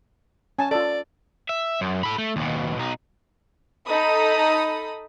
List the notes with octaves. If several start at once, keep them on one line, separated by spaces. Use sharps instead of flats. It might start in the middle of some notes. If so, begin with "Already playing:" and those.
C#4 G#5 A5
F4 A4 D5
E5
F#2
A4 B5
A3
D#2 B2
B1 D#4
D#4 A4 B5 D#6